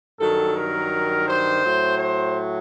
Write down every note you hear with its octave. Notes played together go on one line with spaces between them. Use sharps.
G2 D#3 F#3 A4
A#4
C5
A2 F#3
C5